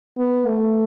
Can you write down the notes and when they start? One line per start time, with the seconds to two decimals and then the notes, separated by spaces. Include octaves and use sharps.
0.18 B3
0.47 A3